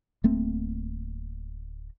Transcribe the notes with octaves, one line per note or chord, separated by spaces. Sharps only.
D1 A3 A#3 C4